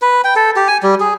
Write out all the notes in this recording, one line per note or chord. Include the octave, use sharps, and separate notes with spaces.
B4
G5
A4
G4
G#5
G3
G#4